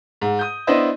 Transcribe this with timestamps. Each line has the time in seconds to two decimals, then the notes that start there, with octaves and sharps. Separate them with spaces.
0.22 G#2
0.39 D#6 G6
0.67 B3 D4 E4 C5 D#5